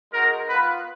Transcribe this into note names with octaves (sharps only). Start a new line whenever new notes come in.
G#3 D#4 F#4 A#4
B3 F4 B4